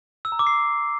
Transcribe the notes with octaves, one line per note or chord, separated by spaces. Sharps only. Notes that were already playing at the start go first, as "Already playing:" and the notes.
E6
A#5
D6
C7